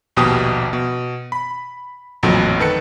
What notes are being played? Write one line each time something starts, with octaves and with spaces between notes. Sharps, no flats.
A#1 D#2 B2 G4 D#6
B2
B5
A1 F2 A#2 D3 F#3
D#3 A4 B4 C#7